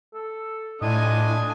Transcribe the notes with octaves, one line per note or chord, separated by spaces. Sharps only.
A4
A2 D4 F4 D#5 G#5